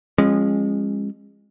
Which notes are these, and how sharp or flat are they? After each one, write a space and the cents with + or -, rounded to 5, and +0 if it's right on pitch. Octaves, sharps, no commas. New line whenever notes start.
F3 +0 G#3 -25 C#4 -35